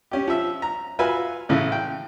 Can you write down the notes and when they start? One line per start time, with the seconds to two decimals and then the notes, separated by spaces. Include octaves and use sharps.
0.11 C#4 G4
0.27 F3 E5
0.62 A#5
0.99 F4 F#4 B4 E5 G#5
1.49 A1 C#3 E3
1.72 G5